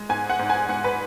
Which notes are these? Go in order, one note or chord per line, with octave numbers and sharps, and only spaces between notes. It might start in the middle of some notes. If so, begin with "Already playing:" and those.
Already playing: G#3
G#2 G#5
F#5
G#2
G#5
G#2 F#5
B4